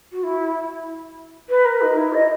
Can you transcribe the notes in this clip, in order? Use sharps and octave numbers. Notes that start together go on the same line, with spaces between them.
F#4
E4
B4
A#4
D#4
E4
D#5